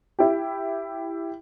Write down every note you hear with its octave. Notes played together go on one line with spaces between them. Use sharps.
E4 G4